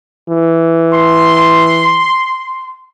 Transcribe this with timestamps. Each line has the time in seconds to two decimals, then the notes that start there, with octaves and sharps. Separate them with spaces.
0.29 E3
0.94 C6